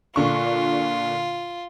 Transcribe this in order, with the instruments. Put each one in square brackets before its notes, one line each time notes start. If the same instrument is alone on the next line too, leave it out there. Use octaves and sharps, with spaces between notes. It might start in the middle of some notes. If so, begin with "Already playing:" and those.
[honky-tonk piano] A#2 D3 C#6 [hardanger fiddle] F4